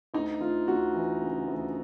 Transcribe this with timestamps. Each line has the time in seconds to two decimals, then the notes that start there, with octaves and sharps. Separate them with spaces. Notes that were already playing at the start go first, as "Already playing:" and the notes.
0.14 D2 D#4
0.41 D2 F4
0.68 D2 F#4
0.94 E3
1.22 C#3
1.48 D2